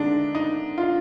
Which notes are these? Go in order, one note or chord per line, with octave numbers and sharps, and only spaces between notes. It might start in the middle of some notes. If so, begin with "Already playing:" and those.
Already playing: D3 G#3 D4 D#4
D#4
F4